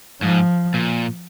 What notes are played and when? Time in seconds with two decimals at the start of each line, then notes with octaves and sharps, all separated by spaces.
0.22 G#2 F3
0.74 A#2